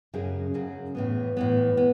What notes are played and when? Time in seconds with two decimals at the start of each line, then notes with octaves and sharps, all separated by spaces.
0.13 F#2 C#3 F#3 C#4 G#4
0.54 F#2 C#3 F#3 C#4 G#4
0.95 A2 E3 B3
1.37 A2 E3 B3
1.77 B3